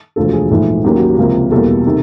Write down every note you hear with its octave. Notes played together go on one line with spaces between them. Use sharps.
E1 D2 D3 F3 A4
G#4
A#1 G#2 E3 A3
D#2 C#3 F#3 A#3 G4
F#4
G4
C#2 C3 F3 A#3
E2 B2 G3 A#3 A4
C3 D#3